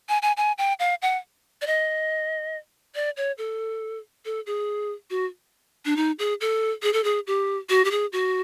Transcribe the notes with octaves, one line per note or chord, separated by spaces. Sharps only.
G#5
G#5
G#5
G5
F5
F#5
D5
D#5
D5
C#5
A4
A4
G#4
F#4
D4
D#4
G#4
A4
G#4
A4
G#4
G4
F#4
G4
G#4
F#4